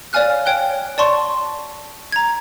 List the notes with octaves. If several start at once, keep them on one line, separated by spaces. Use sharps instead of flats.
C#5 D5 F5 G#5 F6 F#6
C#5 G5 F#6 G7
D5 A5 C6 C#6
A#5 G#6